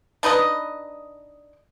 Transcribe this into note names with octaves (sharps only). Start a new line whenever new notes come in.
D4 D#4 B4 D#5